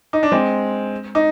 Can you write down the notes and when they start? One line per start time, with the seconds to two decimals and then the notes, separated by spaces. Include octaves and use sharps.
0.13 D#4
0.23 D4
0.32 G#3 C4
1.15 D#4